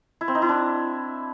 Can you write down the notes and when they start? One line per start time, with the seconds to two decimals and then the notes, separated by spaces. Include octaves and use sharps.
0.21 E4
0.28 C4
0.35 D#4
0.42 E4
0.49 D4